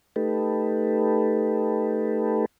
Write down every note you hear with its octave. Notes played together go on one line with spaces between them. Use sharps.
A3 D#4 G4 A4 B4